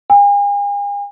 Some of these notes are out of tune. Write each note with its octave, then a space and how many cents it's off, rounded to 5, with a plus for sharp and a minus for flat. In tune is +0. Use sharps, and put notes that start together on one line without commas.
G#5 -45